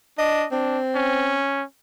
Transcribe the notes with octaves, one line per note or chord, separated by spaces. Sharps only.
D4 D#5
C4 D4
C#4